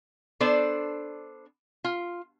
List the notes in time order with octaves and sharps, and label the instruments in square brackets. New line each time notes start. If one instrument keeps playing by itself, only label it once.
[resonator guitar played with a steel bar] B3 D4 A4 C5 D5
F4